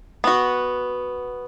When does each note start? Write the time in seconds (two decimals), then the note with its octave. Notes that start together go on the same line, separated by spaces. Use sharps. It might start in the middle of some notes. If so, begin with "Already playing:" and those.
0.24 B3 F#4